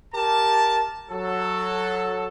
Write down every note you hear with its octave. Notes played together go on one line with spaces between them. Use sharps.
G4 A#4 A5
F#3 A4